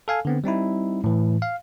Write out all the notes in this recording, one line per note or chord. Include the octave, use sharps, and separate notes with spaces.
A4 F5 G#5
D3 B3 C4
G3 C4 D#4 E4
A2 E3
F5